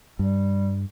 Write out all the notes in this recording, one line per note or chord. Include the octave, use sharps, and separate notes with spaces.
G2 G3